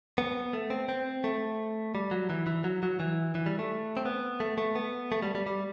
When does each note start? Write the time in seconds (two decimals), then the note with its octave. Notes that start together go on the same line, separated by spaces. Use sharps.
0.18 B3
0.53 A3
0.70 C4
0.89 C4
1.24 A3
1.95 G3
2.11 F#3
2.30 E3
2.47 E3
2.64 F#3
2.83 F#3
3.00 E3
3.35 E3
3.46 G3
3.59 A3
3.97 C4
4.05 B3
4.40 A3
4.58 A3
4.75 B3
5.12 A3
5.22 G3
5.35 G3
5.46 G3